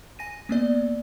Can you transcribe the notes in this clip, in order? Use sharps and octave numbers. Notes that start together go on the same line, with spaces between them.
G#5 A#6 D#7
A#3 B3 D5